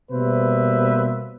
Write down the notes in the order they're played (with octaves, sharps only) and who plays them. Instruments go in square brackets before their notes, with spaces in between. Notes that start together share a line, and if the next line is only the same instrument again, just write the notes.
[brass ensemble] B2 G3 A#3 B4 C5 E5